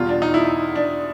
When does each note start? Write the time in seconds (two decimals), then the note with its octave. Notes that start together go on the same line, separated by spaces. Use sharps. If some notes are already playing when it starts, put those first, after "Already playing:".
Already playing: E2 B2 G3 F4
0.09 D4
0.22 D#4
0.34 E4
0.76 D4